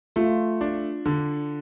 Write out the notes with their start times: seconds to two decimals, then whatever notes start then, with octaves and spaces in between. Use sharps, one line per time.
0.16 A3 F4
0.61 D4
1.06 D3